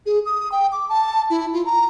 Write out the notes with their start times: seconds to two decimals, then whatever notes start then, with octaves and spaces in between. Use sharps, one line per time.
0.06 G#4
0.26 D#6
0.52 G5
0.72 D6
0.89 A5
1.30 E4
1.54 F4
1.66 A#5